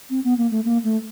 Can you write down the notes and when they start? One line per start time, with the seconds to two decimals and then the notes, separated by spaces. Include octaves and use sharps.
0.10 C4
0.24 B3
0.38 A#3
0.51 A3
0.65 A#3
0.84 A3